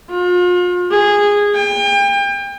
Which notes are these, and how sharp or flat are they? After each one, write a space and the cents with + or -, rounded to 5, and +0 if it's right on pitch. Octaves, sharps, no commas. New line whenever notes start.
F4 +40
G#4 -15
G5 +35